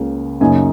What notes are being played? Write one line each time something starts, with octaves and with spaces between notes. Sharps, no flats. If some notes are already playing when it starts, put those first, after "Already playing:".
Already playing: C#2 C#3 A#3
F#2 C#3 A#3 D#4 G#5